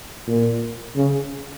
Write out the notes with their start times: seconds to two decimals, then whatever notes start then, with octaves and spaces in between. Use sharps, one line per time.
0.27 A#2
0.96 C#3